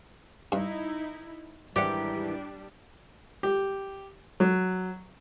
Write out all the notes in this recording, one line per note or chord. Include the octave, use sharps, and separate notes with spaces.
G2 D#4 E4
G#2 D#3 E3 G3 D4 G4 D5 F#5
G4
F#3